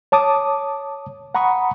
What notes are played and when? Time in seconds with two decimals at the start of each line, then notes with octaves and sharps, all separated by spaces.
0.12 C#5 A5 D6 D#6
1.35 F#5 A#5 B5 C#6 D#6